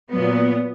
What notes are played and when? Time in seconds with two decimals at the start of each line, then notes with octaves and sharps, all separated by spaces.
0.12 A#2 F#3 B3